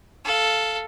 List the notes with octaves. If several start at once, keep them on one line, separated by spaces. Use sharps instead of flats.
A4 F5